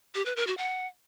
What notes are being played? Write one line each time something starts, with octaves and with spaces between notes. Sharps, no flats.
G4
B4
A#4
F#4
F#5